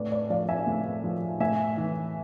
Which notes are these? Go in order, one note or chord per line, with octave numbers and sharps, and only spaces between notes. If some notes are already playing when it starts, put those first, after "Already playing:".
Already playing: A2 B4 D5
B4 D5
F3 D5 F5
E5 G#5
A2
F3
A2 E5 G#5
E3